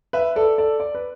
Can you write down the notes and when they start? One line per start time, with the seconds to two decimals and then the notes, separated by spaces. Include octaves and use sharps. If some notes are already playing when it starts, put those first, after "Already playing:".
0.13 B4 E5
0.36 A4 D5
0.58 A4 D5
0.80 D5
0.95 B4